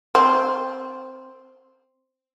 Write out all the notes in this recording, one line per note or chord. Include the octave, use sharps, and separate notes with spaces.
C4